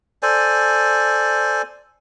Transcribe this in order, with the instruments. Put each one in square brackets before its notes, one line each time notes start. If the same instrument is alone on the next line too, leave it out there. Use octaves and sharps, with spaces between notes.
[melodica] A4 C5 D5 G#5